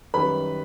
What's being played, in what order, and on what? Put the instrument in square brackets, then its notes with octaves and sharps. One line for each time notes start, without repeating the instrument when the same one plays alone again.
[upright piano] F#2 D#3 G3 B4 B5